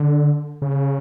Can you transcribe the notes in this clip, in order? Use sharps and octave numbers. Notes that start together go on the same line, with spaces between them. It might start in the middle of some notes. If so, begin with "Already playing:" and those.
Already playing: D3
C#3